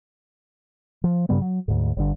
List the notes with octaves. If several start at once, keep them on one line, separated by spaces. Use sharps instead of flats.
F3
G2 C#3 G3 B3
F#3
D2 G#2
G1 G2 D3